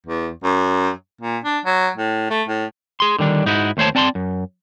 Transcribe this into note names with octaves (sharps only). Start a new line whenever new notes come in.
E2
F#2
A#2
D4
F#3
A2
A3
A2
G#4 C6
D3 D#3 G3 D4
G#2 D#4 E4 F#4
D#2 A3 C5 C#5 A5
C4 D5 A5 A#5 C6
F#2